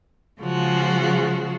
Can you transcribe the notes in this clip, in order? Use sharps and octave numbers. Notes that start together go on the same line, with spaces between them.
C#3 F3 G#3 F4 F#4